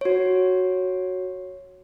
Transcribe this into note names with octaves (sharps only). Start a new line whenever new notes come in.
F#4 C#5